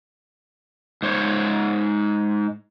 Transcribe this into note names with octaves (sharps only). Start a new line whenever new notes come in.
G#2 C5 C#5